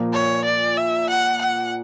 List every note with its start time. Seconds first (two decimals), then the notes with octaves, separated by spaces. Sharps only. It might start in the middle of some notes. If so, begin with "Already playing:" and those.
Already playing: A#2 F3 A#3
0.13 C#5
0.45 D5
0.77 E5
1.10 F#5
1.42 F#5